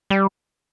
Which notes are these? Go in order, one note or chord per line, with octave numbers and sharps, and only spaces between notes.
G3